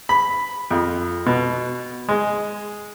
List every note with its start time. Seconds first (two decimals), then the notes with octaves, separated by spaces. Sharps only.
0.09 B5
0.71 F2
1.26 B2
2.09 G#3